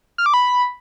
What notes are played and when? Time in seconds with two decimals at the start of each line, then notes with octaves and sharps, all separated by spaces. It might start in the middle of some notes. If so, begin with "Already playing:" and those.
0.18 F6
0.26 D6
0.34 B5